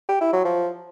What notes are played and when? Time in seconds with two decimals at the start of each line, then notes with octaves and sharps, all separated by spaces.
0.09 G4
0.21 E4
0.33 F#3
0.45 F3